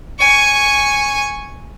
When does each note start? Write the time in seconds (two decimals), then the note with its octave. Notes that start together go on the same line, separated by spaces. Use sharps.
0.19 G#5 C#6